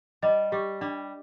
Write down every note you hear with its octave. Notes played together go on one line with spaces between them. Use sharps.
G3 D#5
G3 G4
G3 D4